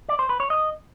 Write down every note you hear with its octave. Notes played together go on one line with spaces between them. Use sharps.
D5
C5
B4
C#5
D#5